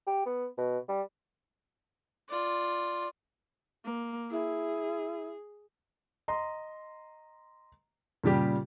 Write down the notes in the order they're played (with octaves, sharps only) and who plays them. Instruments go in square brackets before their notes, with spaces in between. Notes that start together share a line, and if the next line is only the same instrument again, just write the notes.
[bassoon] G4
B3
B2
G3
[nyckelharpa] F4 D5
[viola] A#3
[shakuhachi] E4 [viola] G#4
[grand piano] D#5 A#5 C6
A#2 C#3 G3 G4